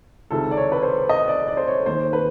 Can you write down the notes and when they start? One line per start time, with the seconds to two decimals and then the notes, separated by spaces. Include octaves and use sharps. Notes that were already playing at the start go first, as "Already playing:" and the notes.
0.30 C#2 C3 D#3 A4
0.51 D5
0.57 C#5
0.72 B4
0.83 C5
1.09 D#5
1.28 D5
1.48 D5
1.57 C5
1.68 C#5
1.86 D#2 D#3 C5
2.13 B4